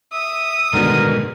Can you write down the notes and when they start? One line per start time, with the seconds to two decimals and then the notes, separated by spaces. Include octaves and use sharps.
0.12 E5 D#6
0.73 G2 B2 D3 D#3 G#3 A#4